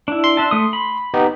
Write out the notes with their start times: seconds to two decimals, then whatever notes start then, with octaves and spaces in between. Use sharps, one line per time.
0.08 D4 E4
0.24 C6
0.37 D4 E5 A5
0.51 A3 D#6
0.73 B5
1.14 B3 D#4 G4